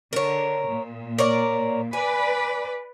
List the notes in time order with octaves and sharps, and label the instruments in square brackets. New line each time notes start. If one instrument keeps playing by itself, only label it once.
[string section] D3 [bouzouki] A#4 C#5
[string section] A#2
[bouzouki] A#4 C#5 D5
[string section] B4 D5 [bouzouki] G#5